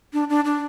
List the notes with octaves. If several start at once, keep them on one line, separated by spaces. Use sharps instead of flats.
D4
D4
D4